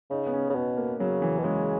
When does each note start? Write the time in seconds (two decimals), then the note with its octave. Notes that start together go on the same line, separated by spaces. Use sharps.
0.11 C#3 D#4
0.26 B3
0.33 C#4
0.50 C#3
0.55 B2 B3
0.77 A#3
1.00 C#3 F#3
1.22 E3
1.39 B2
1.44 C#3 G#3